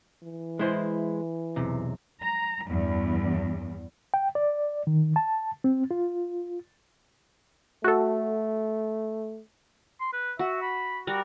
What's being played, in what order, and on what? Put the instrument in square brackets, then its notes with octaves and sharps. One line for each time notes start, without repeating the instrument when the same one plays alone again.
[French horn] E3
[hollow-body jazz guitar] G#3 E4 C5
B1 E2 C3
[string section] A#5
E2 G2
[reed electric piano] G5
D5
D#3
A5
C4
F4
[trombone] A3 [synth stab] F#4 A4
[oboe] C6
B4
[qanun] F#4 [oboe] E5
[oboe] B5
[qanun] G3 A#4 [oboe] F#4